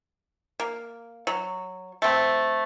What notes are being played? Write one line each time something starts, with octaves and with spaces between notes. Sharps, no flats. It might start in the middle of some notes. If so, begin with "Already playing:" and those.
A#3
F#3
A3 C4